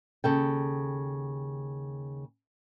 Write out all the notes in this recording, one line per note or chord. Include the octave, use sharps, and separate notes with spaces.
D#2 C#3 A4 G5